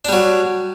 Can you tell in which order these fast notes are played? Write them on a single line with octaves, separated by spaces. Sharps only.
D4 G3 F#3